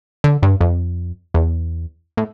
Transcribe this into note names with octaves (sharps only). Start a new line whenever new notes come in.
D3
G2
F2
E2
A2